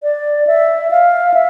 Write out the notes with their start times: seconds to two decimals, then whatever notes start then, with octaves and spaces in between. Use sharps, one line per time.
0.03 D5
0.47 E5
0.91 F5
1.34 E5